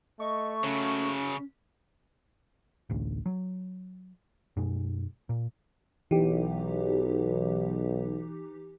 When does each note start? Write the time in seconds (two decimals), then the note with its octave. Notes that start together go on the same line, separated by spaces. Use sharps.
0.20 A3 D#5 C#6
0.64 C#3 F#3 C#4
2.90 A1 D2
3.26 F#3
4.57 F#2 B2 G#3
5.29 A#2
6.11 B1 E3 D#4 G4